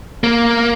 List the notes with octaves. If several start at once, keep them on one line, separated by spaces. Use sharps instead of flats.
A#3